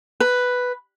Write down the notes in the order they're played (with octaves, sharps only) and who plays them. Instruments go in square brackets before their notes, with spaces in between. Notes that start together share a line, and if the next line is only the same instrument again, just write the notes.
[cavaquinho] B4